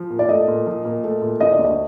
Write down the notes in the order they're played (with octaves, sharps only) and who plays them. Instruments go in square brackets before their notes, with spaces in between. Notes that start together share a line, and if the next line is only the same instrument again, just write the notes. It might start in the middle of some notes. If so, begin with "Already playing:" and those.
Already playing: [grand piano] F3
A#2
[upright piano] D5
[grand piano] A3 [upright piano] D#5
[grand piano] A#2
F3
A#2
A3
A#2
[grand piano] D3 [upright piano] D#5
[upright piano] D5
[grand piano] D2
[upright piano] D#5